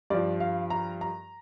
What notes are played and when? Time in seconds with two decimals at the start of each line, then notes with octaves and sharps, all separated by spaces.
0.10 G2 F3 D5
0.40 F5
0.70 A#5
1.01 A#5